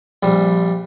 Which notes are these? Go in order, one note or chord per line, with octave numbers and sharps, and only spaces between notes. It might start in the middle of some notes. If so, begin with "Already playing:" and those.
A#1 G3